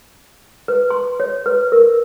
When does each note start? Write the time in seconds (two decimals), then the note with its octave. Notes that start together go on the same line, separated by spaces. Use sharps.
0.68 B4
0.90 C6
1.20 C#5
1.46 B4
1.72 A#4